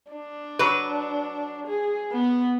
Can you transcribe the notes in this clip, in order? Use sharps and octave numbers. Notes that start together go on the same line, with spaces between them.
D4
F#3 B4
G#4
B3